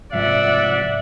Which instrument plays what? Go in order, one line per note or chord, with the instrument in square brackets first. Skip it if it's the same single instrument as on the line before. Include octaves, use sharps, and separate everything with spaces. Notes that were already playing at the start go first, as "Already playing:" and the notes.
[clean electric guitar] C2 G#2 F3 [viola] D5 F#5 [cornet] E5